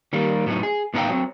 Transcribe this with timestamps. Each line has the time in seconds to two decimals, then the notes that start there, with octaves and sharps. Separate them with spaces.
0.13 D#3 G3 A#3
0.46 A2 F#3 B3 D#4
0.63 G#4
0.94 A2 B3 D#4 A#4 F5 G5
1.09 F#3 C4